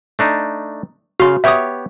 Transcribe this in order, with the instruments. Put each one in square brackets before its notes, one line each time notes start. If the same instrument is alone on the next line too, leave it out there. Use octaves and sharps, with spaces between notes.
[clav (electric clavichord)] A3 D4 D#4
[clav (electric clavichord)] C#3 F5 [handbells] F#4 C6
[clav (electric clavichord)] B3 G4 C#5 [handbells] E5 D#6